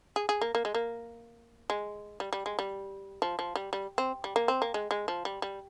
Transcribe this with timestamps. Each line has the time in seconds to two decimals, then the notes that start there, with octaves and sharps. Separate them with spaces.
0.16 G#4
0.29 G#4
0.41 A#3
0.55 A#3
0.65 G#3
0.75 A#3
1.70 G#3
2.20 G3
2.33 G3
2.46 G#3
2.59 G3
3.22 F3
3.39 F3
3.56 G3
3.73 G3
3.98 C4
4.24 G3
4.36 A#3
4.48 C4
4.62 A#3
4.74 G#3
4.91 G#3
5.08 F3
5.25 G3
5.42 G3